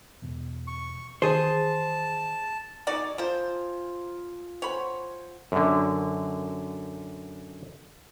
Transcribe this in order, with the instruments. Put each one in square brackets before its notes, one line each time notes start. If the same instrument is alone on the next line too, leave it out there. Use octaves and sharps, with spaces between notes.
[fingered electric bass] E2 B2
[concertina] C#6
[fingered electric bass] D#3 E3 [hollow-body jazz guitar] G#4 C5 [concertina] A5
[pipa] D#4 F#4 D5 [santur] G#5 D#6 E6
[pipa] F3 C5 [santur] F4 A#5
[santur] C5 F#5 G#5 [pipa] C#5 B5
[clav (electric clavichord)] F#2 D3